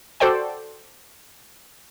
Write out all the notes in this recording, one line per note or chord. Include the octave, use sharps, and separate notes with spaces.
F#4 A4 C5 D5 G5